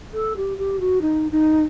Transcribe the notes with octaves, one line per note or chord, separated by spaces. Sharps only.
A4
G4
G4
F#4
D#4
D#4